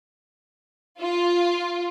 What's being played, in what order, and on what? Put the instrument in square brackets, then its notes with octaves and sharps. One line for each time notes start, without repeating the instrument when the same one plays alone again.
[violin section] F4